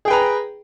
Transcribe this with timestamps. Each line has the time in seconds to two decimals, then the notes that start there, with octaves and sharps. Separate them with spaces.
0.05 G#4
0.08 G5
0.10 B4
0.13 A#5